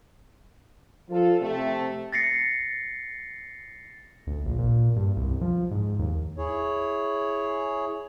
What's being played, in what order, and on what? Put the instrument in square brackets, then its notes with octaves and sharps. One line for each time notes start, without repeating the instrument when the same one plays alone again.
[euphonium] F3 [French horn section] D4 F4 A4
[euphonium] C3 [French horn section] A3
[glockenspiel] A6 A#6 C7 C#7
[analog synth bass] D2
A#1
A#2
G2
C2
F3
G#2
D#2
[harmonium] E4 G#4 C#5